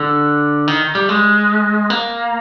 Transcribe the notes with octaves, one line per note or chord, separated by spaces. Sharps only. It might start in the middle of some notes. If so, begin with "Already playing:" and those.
Already playing: D3
D#3
G3
G#3
A#3